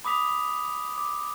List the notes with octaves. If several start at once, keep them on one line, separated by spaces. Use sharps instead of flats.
B5 D6 D#6 B6 F7
D6